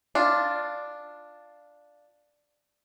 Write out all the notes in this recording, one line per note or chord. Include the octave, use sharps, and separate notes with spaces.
D4 F4